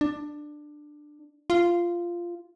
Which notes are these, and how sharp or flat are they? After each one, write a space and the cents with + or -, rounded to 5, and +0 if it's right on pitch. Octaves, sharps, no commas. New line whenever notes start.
D4 +15
F4 -10